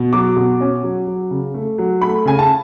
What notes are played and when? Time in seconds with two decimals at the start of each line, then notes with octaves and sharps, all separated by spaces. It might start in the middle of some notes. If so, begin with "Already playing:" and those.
Already playing: B2
0.13 F#3 D6
0.36 B2
0.61 C#4
0.84 F#3
1.07 F#3
1.31 C#3
1.54 A3
1.78 F#3
2.01 A3 B5
2.25 C#3 G#5
2.39 A5